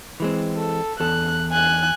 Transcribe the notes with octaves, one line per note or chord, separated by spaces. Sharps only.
E3 G#3 C4
A4
E2 A4 F#6
G#5 F#6